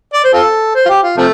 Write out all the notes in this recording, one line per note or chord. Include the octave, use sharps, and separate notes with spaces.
D5
C5
C4 F4 A4
C5
F4
G4
F4
C3 F3 A3